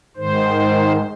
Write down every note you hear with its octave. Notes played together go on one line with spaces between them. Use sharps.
G#2 D#3 C5